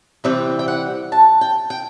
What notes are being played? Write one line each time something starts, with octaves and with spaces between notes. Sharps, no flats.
C3 E3 G3 C4
G5
F#5
A5
G5
G5